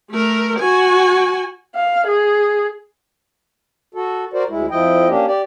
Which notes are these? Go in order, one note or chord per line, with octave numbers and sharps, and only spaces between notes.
A3 A#4
F#4 G#5
F5
G#4
F#4 A4
F#4 A#4 C5 D5
D2 G#3 E4
F2 F3 E4 D#5 G5
A#3 C#4 D4 G4
G4 D5